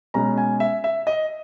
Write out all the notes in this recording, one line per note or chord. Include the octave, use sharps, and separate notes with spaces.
B2 G#3 C#4 A#5
G#5
E5
E5
D#5